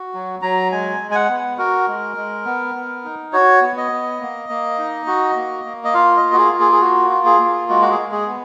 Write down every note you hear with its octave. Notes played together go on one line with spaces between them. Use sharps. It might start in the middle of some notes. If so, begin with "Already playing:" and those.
Already playing: F#4
F#3
F#3 A#5
G#3 G#5
G#3
G#5
F#5
B3
F#4 A#4
G#3
G#3
B3
B3
D#4
F#4 C#5
B3
D#5
B3
A#3
A#3
D#4
F#4
A#3
A#3
D#5
F4 F5
D#5
A#3
F#4
G#4
F4
G#4
G#4
A#3 F#4
F4
G#4
A#3
G#3 F#4
F#4
G#4
G#3
G#4
B3